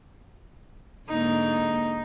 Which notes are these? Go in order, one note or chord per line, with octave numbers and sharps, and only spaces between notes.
G#2 D3 A#3 D#4